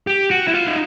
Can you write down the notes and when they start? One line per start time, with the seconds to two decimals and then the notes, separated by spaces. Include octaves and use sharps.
0.07 G4
0.31 F#4
0.48 E4
0.54 F4
0.66 D#4